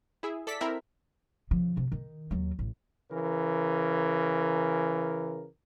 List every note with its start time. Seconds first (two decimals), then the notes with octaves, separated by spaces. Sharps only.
0.23 E4 G#4 E5
0.47 A4 D5 B6
0.61 C4 E4 A#4 E5 B5
1.51 C#3 F3
1.77 C3
1.92 D#3
2.31 D#2 F#3
2.59 A1
3.10 C#3 E3 A#4